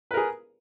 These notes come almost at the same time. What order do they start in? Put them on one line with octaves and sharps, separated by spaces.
B4 A#4 G#4